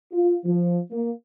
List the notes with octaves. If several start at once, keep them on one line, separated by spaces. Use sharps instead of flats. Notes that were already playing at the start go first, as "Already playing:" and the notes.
F4
F3
A#3